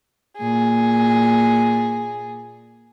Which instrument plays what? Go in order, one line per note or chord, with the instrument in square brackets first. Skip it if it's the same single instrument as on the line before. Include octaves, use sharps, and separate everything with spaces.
[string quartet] A#2 G#4